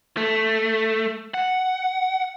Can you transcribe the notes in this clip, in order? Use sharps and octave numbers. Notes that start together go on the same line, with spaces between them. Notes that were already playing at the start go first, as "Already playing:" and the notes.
A3
F#5